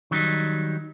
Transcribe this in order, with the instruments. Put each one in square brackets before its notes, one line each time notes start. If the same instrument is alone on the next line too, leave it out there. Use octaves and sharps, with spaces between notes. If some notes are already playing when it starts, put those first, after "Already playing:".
[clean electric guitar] D#3 F#3 G3 D4 D#4